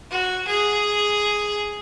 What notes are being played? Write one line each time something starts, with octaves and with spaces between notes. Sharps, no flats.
F#4
G#4